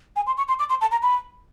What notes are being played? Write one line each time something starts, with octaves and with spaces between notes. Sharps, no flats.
G#5
C6
C#6
C6
D6
C6
A5
A#5
B5